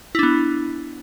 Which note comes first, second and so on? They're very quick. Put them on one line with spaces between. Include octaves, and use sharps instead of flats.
E4 D4 B3